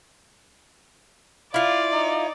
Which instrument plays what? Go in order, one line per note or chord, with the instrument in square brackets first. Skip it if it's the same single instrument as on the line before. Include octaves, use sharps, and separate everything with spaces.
[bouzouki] E4 F4 [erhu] D5 [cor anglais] F5
[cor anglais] D#4